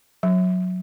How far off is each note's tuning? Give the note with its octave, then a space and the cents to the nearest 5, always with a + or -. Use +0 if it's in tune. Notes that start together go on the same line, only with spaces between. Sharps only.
F#3 -15